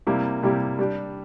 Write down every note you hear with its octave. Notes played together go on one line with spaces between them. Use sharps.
C3 G3 A#3 E4 G4
C3 G3 A#3 E4 G4
G3 D4 G4